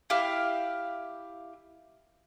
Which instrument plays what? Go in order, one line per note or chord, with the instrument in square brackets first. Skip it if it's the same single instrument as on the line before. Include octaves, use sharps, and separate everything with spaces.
[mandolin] E4 G4 F5